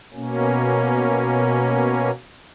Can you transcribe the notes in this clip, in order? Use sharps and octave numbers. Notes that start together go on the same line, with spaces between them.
B2 A#3 C#4